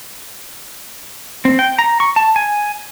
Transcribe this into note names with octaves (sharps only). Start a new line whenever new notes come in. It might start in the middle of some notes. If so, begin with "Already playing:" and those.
C4
G5
A#5
C#6
A5
G#5